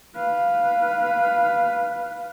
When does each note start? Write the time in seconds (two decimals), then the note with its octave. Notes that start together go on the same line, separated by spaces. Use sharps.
0.15 B4 F5